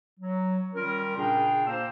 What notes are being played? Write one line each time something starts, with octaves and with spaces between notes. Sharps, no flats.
F#3
D#3 G3 C#4 F4 A#4
A#2 C#3 D4 G#4 F5 G5
A#2 A#3 C5 E6